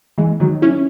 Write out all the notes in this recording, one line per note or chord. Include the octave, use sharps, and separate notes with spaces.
E3 G#3
D#3 F#3
C#4 E4